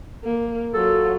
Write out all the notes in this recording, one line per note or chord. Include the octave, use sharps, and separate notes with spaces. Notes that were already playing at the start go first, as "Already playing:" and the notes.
A#3
F#3 F4 A4